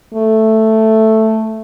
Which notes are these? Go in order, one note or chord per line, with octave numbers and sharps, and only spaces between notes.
A3